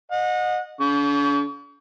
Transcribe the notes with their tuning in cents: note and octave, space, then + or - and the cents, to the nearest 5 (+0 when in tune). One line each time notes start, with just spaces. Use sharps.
D#5 -20 F#5 -30
D3 -45 C#6 +40